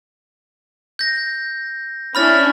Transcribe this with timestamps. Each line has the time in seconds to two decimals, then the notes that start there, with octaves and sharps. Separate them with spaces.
0.99 G6 A#6
2.15 C#4 D4 E4 B5 F6 A6